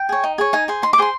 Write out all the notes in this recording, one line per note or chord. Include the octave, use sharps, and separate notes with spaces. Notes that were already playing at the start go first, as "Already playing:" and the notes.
Already playing: G5
G#4 C#5
D#4
G#4 C#5
D#4 G#5
G#4 C5
D#4 C6
D6
G#4 C5 C6